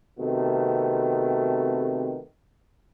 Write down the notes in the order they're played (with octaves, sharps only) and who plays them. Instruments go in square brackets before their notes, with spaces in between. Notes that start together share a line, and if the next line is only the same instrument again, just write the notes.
[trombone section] C3 D#3 A3 B3 C4 F#4